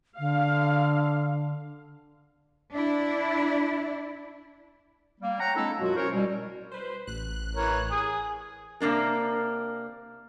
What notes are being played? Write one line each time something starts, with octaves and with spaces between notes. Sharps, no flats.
D3 F5
D4 E4
G3 A#3
C#5 F#5 G5 A#5
G#3 A#3 C4 D4 E4 A4
F#2 B2 F#3 F4 F#4
C#4 E4 F#4 A#4 C5 C#5
B2 G3
B4 C5
A1 F#6
E3 A#4 C#5
G#5 D#6
C3 A#3 D4 A#4